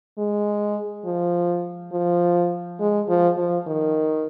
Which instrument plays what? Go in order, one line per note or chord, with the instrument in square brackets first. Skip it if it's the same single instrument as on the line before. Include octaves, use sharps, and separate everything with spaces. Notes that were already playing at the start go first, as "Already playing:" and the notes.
[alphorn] G#3
F3
F3
G#3
F3
F3
D#3